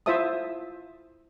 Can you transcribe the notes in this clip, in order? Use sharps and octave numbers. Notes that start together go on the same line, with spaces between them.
E4 F4 C5 E5 A5 D#6